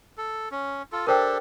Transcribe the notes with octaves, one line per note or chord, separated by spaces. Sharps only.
A4
C#4
F4 A4
D4 G4 A4 A#4 C5 G5